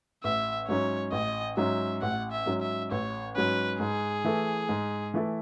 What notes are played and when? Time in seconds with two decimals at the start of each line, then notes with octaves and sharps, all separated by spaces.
0.24 A1 E5
0.68 G#2 F#3 C#4 C#5
1.12 A1 D#5
1.57 G#2 F#3 C#4 E5
2.02 A1 F#5
2.32 E5
2.46 G#2 F#3 C#4
2.62 E5
2.91 A1 C#5
3.35 G#2 F#3 C#4 B4
3.80 G#2 G#4
4.24 E3 A3 E4 A4
4.69 G#2
5.14 E3 A3 E4 A4